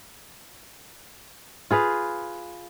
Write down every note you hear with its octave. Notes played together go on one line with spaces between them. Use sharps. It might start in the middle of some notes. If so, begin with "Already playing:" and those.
F4 G#4 B4 F5